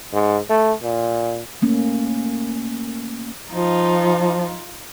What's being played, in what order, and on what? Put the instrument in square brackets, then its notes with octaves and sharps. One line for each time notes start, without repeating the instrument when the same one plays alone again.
[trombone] G#2
A3
A#2
[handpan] A3 A#3 C#4
[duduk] F3 [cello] D#4 F4